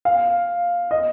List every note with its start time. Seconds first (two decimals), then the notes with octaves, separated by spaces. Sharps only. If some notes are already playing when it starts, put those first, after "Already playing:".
0.05 F5
0.91 D#5